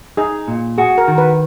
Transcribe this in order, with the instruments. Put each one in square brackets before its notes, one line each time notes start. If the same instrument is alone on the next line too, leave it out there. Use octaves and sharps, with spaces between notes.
[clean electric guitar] D#4 [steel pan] G#4
[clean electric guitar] A#2
[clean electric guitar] F#4 [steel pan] G#4
[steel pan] A#4
[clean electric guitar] D#3
[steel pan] B4